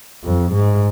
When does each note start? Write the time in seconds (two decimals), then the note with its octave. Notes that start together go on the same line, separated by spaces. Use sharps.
0.25 F2
0.53 G#2